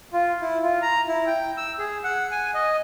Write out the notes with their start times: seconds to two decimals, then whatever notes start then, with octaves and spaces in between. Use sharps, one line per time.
0.13 F4
0.41 E4
0.63 F4
0.82 A#5
1.08 E4
1.26 G5
1.57 E6
1.79 G#4
2.04 F#5
2.32 G#5
2.54 D#5